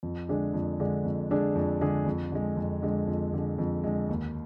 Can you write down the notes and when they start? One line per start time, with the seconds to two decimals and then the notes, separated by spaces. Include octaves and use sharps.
0.03 F2
0.28 D3 G#3 D4 G#4
0.54 F2
0.80 D3 G#3 D4 G#4
1.05 F2
1.31 D3 G#3 D4 G#4
1.55 F2
1.81 D3 G#3 D4 G#4
2.06 F2
2.31 D3 G#3
2.57 F2
2.82 D3 G#3
3.08 F2
3.33 D3 G#3
3.58 F2
3.84 D3 G#3
4.09 D#2